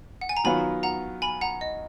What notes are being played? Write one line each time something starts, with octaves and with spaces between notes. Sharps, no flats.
F#5
G#5
A#5
D#3 F#3 B3 F4 G#5 B5
F#5 A#5
G#5 B5
F#5 A#5
D#5